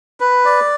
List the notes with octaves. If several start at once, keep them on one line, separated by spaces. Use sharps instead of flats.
B4
D5